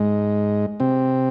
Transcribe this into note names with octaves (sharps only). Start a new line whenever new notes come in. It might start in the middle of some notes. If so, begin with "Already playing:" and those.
Already playing: G#2 G#3
C3 C4